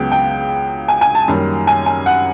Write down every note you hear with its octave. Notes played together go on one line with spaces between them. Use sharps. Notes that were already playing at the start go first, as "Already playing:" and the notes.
Already playing: C#2 C#3 F#3 B3 G5
G5
G#5
G#5
A5
F#2 D#3 G3 A#3
G#5
G#5
F#5